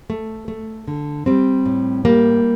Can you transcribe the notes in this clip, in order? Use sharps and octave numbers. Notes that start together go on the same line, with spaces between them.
A3
A3
D3
G3 C4
A2
G3 A#3